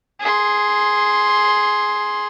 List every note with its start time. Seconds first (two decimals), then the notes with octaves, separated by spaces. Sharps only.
0.21 G#4 C6